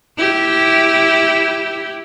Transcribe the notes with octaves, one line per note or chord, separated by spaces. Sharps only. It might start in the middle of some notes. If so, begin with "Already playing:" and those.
E4 G4